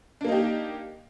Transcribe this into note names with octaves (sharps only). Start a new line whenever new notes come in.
A#3 D4 D#4 G4